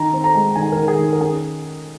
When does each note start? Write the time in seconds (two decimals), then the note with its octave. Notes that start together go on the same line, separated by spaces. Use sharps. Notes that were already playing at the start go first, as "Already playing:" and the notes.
Already playing: D#3 A#5
0.13 C4
0.24 A#5
0.35 G#3
0.56 D#3 G#5
0.72 D#3 A#4
0.88 G#4
0.99 D#3
1.13 A#4
1.21 C#4 G#4